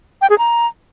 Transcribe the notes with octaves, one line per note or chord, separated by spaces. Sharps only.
G5
G#4
A#5